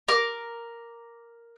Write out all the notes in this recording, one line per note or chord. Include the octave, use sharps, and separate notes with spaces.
A#4 D6